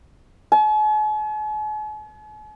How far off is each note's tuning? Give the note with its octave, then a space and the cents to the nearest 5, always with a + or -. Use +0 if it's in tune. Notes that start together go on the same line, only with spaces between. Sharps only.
G#5 +45